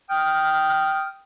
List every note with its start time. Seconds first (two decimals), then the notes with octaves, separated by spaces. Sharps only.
0.10 G5 D#6 F6